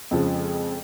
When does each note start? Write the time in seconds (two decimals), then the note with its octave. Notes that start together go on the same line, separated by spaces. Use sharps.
0.11 F2 C#3 F3 G#3